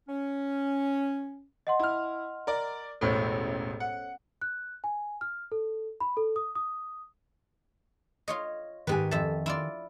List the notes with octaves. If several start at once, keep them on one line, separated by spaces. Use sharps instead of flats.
C#4
D#5 F#5 C6
E4 F6
A#4 D5
E1 A1 A2 A4 C5 C#5
F#5
F#6
G#5
F6
A4
B5
A4
D#6
D#6
F4 C#5 D#5
G#2 D#3 G4 B4 G#5
F2 E5 A5
E4 F4 D5